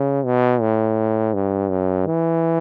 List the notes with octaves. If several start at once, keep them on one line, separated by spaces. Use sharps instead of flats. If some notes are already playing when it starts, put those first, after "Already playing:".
Already playing: C#3
B2
A2
G2
F#2
E3